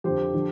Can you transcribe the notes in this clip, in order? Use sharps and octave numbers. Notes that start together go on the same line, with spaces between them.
F2 D3 F3 G4 C5
D3 F3